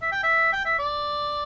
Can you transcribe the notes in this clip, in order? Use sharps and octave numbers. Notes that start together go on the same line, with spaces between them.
E5
G5
E5
G5
E5
D5